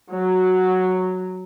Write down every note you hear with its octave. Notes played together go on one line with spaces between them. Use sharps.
F#3